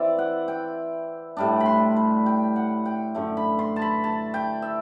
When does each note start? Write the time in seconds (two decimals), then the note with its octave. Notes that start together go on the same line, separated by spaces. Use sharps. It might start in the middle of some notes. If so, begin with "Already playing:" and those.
Already playing: E3 C4 E4 D5 E5
0.19 F#5
0.48 G5
1.37 A2 G3 D4
1.60 B5
1.66 C6
1.97 B5
2.26 G5
2.56 F#5
2.86 G5
3.15 F#2 D3 A3
3.37 B5
3.59 C6
3.76 A5
3.82 B5
4.04 A5
4.34 G5
4.62 E5